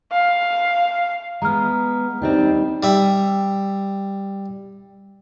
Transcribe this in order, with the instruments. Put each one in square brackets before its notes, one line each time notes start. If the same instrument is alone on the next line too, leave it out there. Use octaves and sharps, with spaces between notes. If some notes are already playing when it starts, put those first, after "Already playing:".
[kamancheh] F5
[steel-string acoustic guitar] G#3 B3 [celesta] A#5 F6
[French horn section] D#2 G3 D#4 [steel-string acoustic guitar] C4 D4 G4
[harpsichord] G3 E5